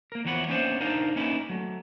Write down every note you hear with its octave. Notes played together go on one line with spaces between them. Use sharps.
A#3 A#4
E2 E3 F3 C#5 F#5 B5
A#3 B3 C#4 D4 C5 E5
D4 D#4 A#4 C5 F5 A5
A#3 C#4 D#4 E4 B4
F#3 A3